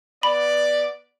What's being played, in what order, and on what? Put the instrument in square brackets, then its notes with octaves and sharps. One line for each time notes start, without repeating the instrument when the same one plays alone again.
[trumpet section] B3 D5 [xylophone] B5